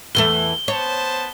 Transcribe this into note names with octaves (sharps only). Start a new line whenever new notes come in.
E2 E3 A3 G7
B3 C5 C#5 A5